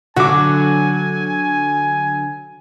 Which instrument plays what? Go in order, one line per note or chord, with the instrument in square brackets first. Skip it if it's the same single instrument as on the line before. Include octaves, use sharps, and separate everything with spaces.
[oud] D3 F#3 [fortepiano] F#4 D6 [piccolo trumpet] G#5